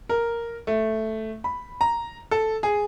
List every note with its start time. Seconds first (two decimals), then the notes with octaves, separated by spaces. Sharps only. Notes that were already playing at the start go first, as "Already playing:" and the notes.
0.09 A#4
0.67 A3
1.44 B5
1.81 A#5
2.31 A4
2.63 G#4